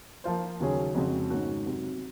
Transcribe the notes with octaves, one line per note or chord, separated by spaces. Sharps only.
F3 A#3 F4 C5
D#2 C#3 F#3 C#4 G#4
F2 C#3 G#3 C4 F#4
G#2 D#3 A#3 C#4 F#4
C3 F#3 C4